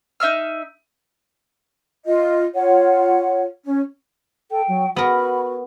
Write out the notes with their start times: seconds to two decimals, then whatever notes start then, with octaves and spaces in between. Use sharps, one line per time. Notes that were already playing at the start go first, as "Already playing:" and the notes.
0.20 D#4 E5 E6 F6
2.06 F4 D#5
2.55 F4 C#5 F#5
3.66 C#4
4.51 A4 G5
4.68 F#3
4.96 B3 F#4 A#4 B5